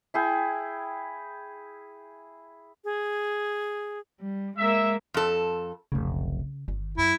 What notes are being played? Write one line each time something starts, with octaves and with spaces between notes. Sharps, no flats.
E4 G#4 G5
G#4
G3
G#3 A#3 E5
F2 A4
F1 B1 C#3
G1 D#3
F#2 E4